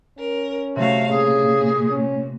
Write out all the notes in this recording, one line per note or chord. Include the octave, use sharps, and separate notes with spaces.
C#4 A#4
C3 A3 F#4 C#5 E5 F5
A#2 C#3 G#4
C#4